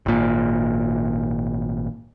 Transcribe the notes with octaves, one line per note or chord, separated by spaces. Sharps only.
G#1 A#2